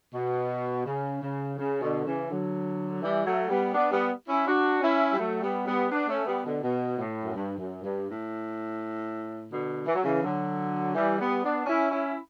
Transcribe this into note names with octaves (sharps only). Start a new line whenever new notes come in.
B2
C#3
C#3
C#3
B2 D3
C#3 E3
D3 F#3
E3 G3
F#3 A3
G3 B3
B3 D4
G3 B3
C#4 E4
D4 F#4
C#4 E4
G3
F#3 A3
G3 B3
G3 B3
B3 D4
A3 C#4
G3 B3
B2 D3
B2
A2
F#2
G2
F#2
G2
A2
B2 D3
E3
F#3
C#3 E3
D3 F#3
E3 G3
G3 B3
B3 D4
C#4 E4
C#4 E4